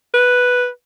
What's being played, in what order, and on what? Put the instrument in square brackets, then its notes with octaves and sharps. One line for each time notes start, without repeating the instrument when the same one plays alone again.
[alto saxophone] B4